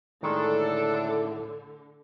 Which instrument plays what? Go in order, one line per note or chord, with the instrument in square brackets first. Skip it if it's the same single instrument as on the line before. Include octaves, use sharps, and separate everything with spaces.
[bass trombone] A2 [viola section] D3 [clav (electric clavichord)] D#3 G#3 [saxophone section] D4 A4